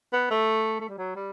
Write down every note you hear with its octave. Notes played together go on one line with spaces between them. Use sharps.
B3
A3
A3
G3
F#3
G3